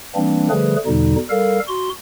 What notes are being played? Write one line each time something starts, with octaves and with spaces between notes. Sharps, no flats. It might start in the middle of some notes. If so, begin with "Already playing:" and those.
E3 G3 A#3 C4 D4
D3 F3 G3 A3 G#4 B4
E2 B2 D3 G3 D#4
G3 A4 A#4 F5
F#4 C6